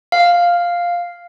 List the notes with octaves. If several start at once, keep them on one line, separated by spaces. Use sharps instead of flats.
F5